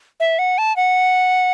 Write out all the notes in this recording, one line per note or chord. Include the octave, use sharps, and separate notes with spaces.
E5
F#5
A5
F#5